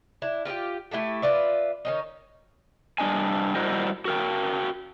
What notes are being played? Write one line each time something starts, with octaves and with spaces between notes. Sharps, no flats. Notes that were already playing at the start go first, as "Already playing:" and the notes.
D4 E4
F4 G4 D#5 G5
A3 E4 G4 A4
F4 B4 D5 E5
D#3 C#4 D#4
G3 D4 D#5 G#5
G3 E4 F#4 A#4 C5 D#5
F#4 A#4 G5